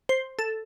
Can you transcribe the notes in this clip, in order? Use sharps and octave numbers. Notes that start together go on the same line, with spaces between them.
C5
A4